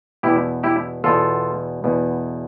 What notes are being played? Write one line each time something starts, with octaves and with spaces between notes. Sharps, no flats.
E2 B2 E4 G4
E4 G4
E2 B2 F4 A4
E2 B2